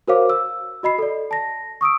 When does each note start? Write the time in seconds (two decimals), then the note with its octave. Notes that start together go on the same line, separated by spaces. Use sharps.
0.08 F#4 A#4 C5 C#5 F5 D6
0.30 E6
0.83 F#4 D#5 B5 C7
0.98 A4 D5
1.31 A5 A#6
1.81 C#6 D#6 E6 D7